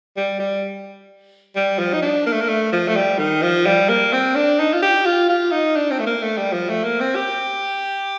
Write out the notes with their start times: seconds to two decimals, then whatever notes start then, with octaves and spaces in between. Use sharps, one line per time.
0.17 G3
0.39 G3
1.56 G3
1.79 F3
1.93 D#4
2.02 D4
2.26 A#3
2.32 A3
2.41 A#3
2.48 A3
2.72 F3
2.88 A3
2.96 G3
3.18 D#3
3.42 F3
3.66 G3
3.88 A#3
4.13 C4
4.35 D4
4.59 D#4
4.73 F4
4.82 G4
5.05 F4
5.29 F4
5.51 D#4
5.76 D4
5.90 C4
5.99 A3
6.06 A#3
6.23 A3
6.37 G3
6.53 F3
6.69 A3
6.84 A#3
7.00 C4
7.15 G4